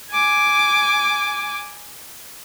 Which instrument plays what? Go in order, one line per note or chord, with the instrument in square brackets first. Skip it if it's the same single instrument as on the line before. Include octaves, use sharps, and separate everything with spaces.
[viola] G#5 D6